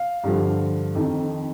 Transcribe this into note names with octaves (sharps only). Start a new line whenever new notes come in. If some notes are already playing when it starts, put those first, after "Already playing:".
Already playing: F5
G2 D3 F3
F2 D#3